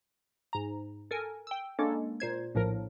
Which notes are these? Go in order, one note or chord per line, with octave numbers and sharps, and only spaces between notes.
G#2 A#5
A4 A#4 G#5
G5 E6
G#3 A#3 C#4 D4 A4
A#2 C5 G#6
A#1 A2 F3 A#4